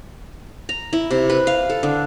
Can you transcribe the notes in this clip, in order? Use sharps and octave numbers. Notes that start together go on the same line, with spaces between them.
A#5
E4
C3
B4
F5
A4
D3